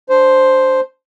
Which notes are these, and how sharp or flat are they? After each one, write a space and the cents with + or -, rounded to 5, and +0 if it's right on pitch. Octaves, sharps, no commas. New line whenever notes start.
D4 -10 C5 +0